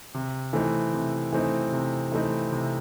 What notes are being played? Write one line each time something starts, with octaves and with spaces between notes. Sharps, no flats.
C3
E3 A3 C4 D#4
C3
E3 A3 C4 D#4
C3
E3 A3 C4 D#4
C3